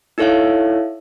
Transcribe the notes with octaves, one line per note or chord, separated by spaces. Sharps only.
D#4 E4 A4 C#5 E5 F5